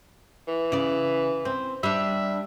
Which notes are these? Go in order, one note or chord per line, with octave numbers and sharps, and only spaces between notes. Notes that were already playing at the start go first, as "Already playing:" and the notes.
E3
C#3 D5
C4
G3 D4 E5